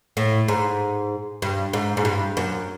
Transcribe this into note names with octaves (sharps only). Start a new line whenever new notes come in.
A2
G#2
G2
G#2
G#2
G2
F#2